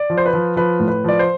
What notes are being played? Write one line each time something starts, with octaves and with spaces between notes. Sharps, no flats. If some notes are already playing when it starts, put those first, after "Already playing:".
Already playing: D5
F3
C5
B4
F3
F3 B4
A2
B4
F3 D5
C5